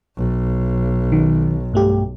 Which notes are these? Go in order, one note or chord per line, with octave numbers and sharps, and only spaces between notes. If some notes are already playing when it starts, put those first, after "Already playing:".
B1
D#3
G2 A3 G4